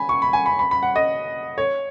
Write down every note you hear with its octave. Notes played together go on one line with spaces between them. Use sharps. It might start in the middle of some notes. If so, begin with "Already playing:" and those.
Already playing: G#5 B5
C#6
B5
G#5
B5
B5
B5
F#5
D#5
C#5